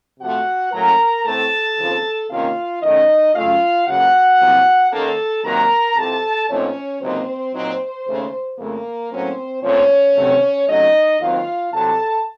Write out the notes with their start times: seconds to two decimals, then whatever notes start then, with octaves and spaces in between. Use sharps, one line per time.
0.20 C3 F3 A3 F#4 F#5
0.72 A2 F#3 A#3 C#4 A#4 A#5
1.25 A2 A3 C4 A4 A5
1.78 D#2 C#3 F3 C4
2.29 C3 D#3 A#3 C#4 F4 F5
2.82 F#2 D#3 A3 C#4 D#4 D#5
3.34 F#2 C#3 A3 C#4 F4 F5
3.87 C#2 C#3 F#3 A#3 F#4 F#5
4.39 C2 C3 F#3 A#3
4.92 D#2 D#3 A#3 C#4 A4 A5
5.44 C3 D#3 F#3 A#3 A#4 A#5
5.97 C2 C3 F3 A4 A5
6.49 A#2 F3 A3 C4 C#4 D#4 C#5
7.01 C#2 C3 F#3 A#3 C4 D#4 C5
7.54 A#2 F#3 C4 D#4
8.07 D#2 C#3 A3 C#4
8.58 F2 C#3 A3 A#3 A#4
9.11 A2 F#3 A#3 C4 C#4 C5
9.63 A#2 F3 A3 C4 C#4 C#5
10.16 C3 D#3 F#3 A3 C4
10.68 C3 F#3 A3 C#4 D#4 D#5
11.21 D#2 D#3 F#3 C4 F4 F5
11.73 C2 C3 F#3 A4 A5